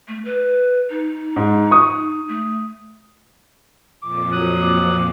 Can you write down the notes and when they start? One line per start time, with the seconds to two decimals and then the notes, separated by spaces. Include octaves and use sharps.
0.08 A3
0.25 B4
0.90 D#4
1.36 G#2
1.71 C#6 D#6
2.28 A3
4.02 F2 A#2 F3 D6
4.32 F#3 D#6 F#6
4.61 D6